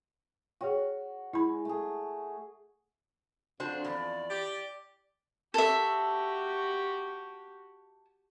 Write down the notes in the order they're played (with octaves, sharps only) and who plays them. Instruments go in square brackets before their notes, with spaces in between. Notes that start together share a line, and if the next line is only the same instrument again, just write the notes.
[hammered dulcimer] F#4 [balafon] G#4 C#5 G5
[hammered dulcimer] G#3 [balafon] E4 B5
[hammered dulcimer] A3 G#4
[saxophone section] F2 [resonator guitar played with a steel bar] D4 F#4 C5
[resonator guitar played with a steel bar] E2 [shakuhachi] D5
[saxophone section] G4
[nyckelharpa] F#4 G4 [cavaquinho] A4 E5